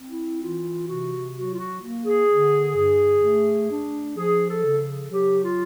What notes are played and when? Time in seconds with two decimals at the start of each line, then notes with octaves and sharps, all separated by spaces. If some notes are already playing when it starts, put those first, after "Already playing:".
Already playing: C4
0.09 E4
0.41 E3 F4
0.87 C3 F#4
1.35 F#3 F#4
1.52 F4
1.58 F#4
1.82 A#3
2.05 G#4
2.29 D3
2.76 G2
3.23 A3
3.71 D4
4.17 F3 G#4
4.49 A4
4.65 C#3
5.12 F#3 G4
5.43 F4